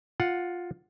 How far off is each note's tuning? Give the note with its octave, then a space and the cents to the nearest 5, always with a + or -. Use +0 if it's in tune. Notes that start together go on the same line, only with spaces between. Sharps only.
F4 +10 F#5 +0